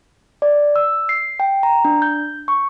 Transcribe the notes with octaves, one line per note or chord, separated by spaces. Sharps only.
D5
E6
C7
G5
A#5
D4
G6
C#6